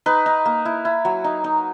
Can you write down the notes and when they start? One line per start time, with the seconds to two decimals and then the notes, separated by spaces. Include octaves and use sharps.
0.06 D#4 B4
0.26 D#4
0.46 A#3
0.65 E4
0.85 E4
1.05 F#3
1.24 D#4
1.44 D#4